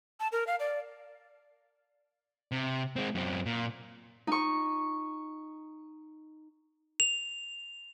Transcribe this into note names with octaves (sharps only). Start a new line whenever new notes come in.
A5
A#4
F5
D5
C3
G#3 C4
F#2 C4
A#2
D#4 C#6
F7